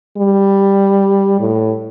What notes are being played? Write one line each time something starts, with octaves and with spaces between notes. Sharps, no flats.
G3
A2